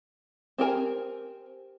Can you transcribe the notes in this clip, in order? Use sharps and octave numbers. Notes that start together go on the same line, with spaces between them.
C4 G4 A#4 G#5